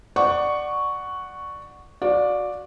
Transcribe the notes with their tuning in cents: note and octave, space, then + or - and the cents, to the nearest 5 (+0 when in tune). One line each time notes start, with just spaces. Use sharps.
D5 +15 F#5 +0 C#6 +0
F#4 -15 D5 +0 F5 +35